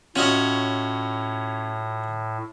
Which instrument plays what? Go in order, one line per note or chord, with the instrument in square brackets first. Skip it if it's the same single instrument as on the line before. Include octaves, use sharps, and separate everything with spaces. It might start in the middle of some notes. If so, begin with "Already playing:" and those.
[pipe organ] A2 [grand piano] C#4 [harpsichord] F4 F#4 D#5